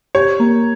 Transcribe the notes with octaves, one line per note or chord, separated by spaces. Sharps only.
G4 C#5
A#3